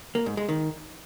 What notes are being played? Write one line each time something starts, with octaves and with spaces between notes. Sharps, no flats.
A#3
G#2
G#3
D#3